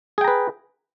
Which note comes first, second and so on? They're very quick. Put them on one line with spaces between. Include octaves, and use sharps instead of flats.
G#4 G5 A#5 B4